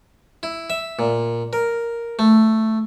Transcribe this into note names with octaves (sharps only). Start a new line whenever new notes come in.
E4
E5
A#2
A#4
A3